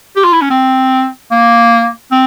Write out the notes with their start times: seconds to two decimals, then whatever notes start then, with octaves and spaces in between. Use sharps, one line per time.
0.16 G4
0.24 F4
0.33 E4
0.41 C#4
0.50 C4
1.31 A#3
2.12 C4